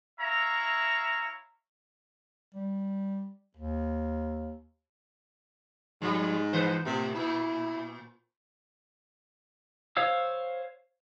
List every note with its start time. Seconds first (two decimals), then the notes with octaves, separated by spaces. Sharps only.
0.20 E4 C#5 E5 F5 A#5
2.55 G3
3.57 D#2
6.02 G#2 F3 G3
6.53 E3 B4 C5
6.85 A2 C3
7.15 A#2 E4
9.97 C5 C#5 F5 E6